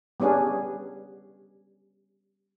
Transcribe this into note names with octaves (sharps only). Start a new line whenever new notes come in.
G3 B3 C#4 D4 G#4